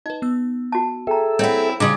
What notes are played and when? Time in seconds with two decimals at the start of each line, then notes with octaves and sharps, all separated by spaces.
0.06 D#4 B4 D#5
0.22 B3 E6
0.72 F#4 A5
1.07 G#4 A4 E5 G5 A#5
1.39 C4 E4 C#5 F#5 G5 G6 G#6
1.80 C#3 G3 A#5 C6 D6 D#6 F#7